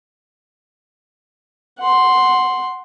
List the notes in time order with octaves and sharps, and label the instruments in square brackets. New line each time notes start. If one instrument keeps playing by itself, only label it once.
[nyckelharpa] F#5 C6